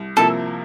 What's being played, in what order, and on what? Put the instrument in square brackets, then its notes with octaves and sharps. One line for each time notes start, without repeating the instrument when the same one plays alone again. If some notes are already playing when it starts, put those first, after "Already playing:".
Already playing: [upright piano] C2
[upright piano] C3 F3 A#3 E4 [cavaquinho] A4